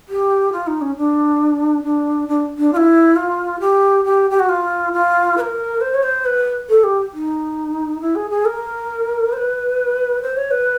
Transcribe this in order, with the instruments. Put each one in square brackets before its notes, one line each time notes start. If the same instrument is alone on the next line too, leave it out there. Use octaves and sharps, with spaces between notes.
[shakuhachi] G4
F4
D#4
C#4
D4
D4
D4
D4
F4
E4
F4
G4
G4
G4
F#4
F4
F4
B4
A#4
C5
C#5
C5
B4
A4
G4
D#4
E4
G#4
G#4
A#4
C5
B4
C5
C#5
B4